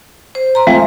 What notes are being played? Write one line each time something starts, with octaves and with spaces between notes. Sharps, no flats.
C5
A#5 C6
F3 G#3 A3 C4